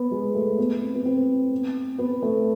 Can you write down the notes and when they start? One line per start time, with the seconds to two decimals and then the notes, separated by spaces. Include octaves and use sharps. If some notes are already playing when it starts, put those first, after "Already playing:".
Already playing: B3
0.11 G#3
0.34 A3
0.59 B3
0.81 C4
0.95 B3
1.06 C4
1.98 B3
2.22 A3